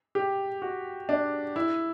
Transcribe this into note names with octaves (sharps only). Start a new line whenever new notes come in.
G4
F#4
D4
E4